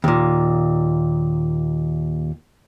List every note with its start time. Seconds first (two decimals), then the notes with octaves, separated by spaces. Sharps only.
0.04 D#2 A#2